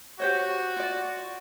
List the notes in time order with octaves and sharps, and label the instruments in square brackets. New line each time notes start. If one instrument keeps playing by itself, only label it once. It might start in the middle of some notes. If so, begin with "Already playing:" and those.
[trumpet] F#4 [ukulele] G4 C5 C#5
[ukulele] F4 D5